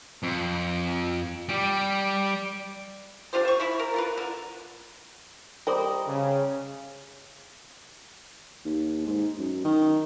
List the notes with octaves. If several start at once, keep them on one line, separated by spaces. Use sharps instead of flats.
F2
G3 G4
D4 F4 G4 C5
C5 C#6
F3 E4 B5
A#4
F4 A#4 B4
D3
G3 A#4 C5 D5 D#5 A#5
C#3
D#2
G#2
F#2
D#3